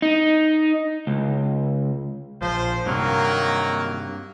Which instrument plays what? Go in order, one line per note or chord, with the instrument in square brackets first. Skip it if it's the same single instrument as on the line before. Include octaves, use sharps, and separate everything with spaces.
[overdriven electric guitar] D#4
C#2
[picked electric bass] A#1 [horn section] F3 C5
[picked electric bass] G2 C3 [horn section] D#3 F#3 A#3